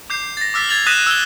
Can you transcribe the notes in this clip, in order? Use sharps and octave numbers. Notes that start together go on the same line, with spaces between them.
D6 G6 C7
A6 A#6
D6 E6 F6 A6 B6
G#6 A6 F7 F#7
D#6 F#6 A#6 B6 D#7 E7
E6 F#6 G#6 G7